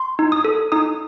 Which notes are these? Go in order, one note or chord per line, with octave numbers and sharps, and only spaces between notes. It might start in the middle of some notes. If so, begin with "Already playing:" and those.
Already playing: C6
D#4
D#6
A4
D#4 D#6